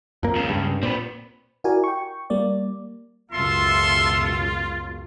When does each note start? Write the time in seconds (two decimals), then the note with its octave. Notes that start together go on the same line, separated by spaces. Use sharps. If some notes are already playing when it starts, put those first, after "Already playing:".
0.23 F2 A#3
0.35 C#2 C#3
0.49 G2
0.83 A#2 C4 B4
1.64 E4 F#4 G4 A#4 D5 G#5
1.84 G5 C#6
2.30 G3 A#3 D5
3.32 C#2 F#2 B2 F4 A4 E5 C6